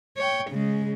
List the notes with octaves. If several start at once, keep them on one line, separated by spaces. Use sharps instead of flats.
C#5 G5
C#3 G#3